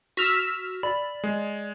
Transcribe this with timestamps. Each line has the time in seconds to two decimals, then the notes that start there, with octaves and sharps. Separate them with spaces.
0.17 F#4 E6 F6 B6
0.83 D5 B5
1.24 G#3